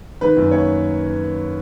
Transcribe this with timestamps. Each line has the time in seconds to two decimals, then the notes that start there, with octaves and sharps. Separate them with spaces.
0.21 D#3 B4
0.36 F#2
0.51 A#3 C#5